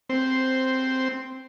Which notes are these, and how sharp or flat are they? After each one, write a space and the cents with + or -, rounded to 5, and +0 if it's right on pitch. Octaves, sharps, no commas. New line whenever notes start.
C4 -5 C5 +0